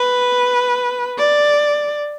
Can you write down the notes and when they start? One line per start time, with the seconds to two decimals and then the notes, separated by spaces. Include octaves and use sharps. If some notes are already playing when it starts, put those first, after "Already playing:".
Already playing: B4
1.18 D5